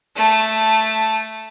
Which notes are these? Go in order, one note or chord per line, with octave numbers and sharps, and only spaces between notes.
A3 A5